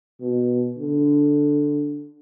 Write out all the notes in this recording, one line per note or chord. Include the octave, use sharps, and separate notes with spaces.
B2
D3